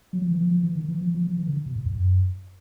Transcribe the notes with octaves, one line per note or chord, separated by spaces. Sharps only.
F#3
F3
E3
F3
F3
E3
D#3
E3
F3
F3
F3
E3
D3
B2
A2
F2
F#2